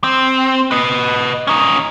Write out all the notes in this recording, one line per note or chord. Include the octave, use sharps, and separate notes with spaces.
C4
B4 D#5
C#4 D#4